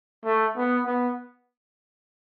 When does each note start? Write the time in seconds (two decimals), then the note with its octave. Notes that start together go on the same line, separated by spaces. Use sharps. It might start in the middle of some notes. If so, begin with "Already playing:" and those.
0.25 A3
0.56 B3
0.86 B3